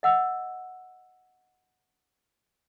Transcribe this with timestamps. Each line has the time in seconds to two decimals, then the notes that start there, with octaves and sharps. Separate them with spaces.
0.03 D#5 F#5 E6